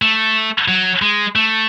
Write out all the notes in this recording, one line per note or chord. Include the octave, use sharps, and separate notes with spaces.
A3
F#3
G#3
A3